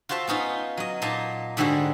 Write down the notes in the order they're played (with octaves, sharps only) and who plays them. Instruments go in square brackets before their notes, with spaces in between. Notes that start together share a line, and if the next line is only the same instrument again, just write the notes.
[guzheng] F4 F#4 C5 E5 A5
B3 C#4 D#4 F4
F#3 D#5
A#2 A#3 D#4 D#5 A5
G#2 D3 G3 F#4 G#4